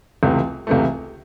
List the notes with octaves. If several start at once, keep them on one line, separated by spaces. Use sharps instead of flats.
C#2 C3 E3 A3
C#2 C3 E3 A3